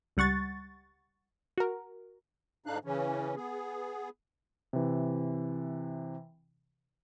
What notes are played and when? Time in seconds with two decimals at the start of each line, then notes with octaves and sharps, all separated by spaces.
0.17 C#2 G3 F#5 C#6 A6
1.58 F#4 A#4
2.66 G#2 D3 D4 D#4 F5 F#6
2.85 C#3 E3 C#4
3.36 B3 G#4
4.73 C3 E3